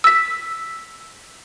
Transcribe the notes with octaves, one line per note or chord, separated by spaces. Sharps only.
E6 B6